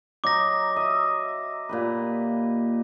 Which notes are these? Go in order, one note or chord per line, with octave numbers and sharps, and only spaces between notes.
F#3 D#4 D6 A#6
D#5 E5
A#2 G4 B4